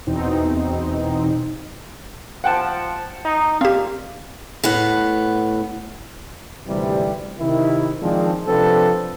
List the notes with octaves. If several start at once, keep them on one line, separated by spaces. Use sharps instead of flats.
E2 B2 C4 D#4
F3 F#5 G5 A5
D#4
A#2 C4 G4 F5
A2 B3 F#5
G#1 D2 C3 E3 G3
C3 D#3 E4
D#3 F3 G#3 C4 D4
C3 F3 C4 D4 A4 B4